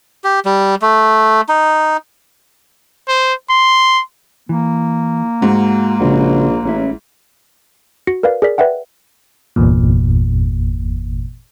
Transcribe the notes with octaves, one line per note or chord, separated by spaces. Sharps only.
G4
G3
A3
D#4
C5
C6
E3 A#3
G#2 F#4
A#1 C#3 F#4
A1 C#4 E4
F#4 A#6 C#7
A#4 B4 D5 F5
G#4 A#4 D5 B6
B4 D5 E5 F#5 G5
G1 E2 A#2